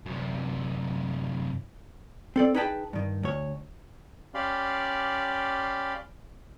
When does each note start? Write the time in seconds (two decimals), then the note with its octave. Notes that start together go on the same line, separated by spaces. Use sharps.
0.06 F#2 C3
2.36 C4 A4 D5
2.54 D#4 G#4 B4 G5 A5
2.93 G2 D#3
3.23 D2 C#5
4.34 C#4 G4 D5 F5 B5 C6